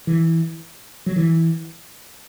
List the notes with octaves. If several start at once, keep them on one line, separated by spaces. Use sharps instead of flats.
E3
F#3
E3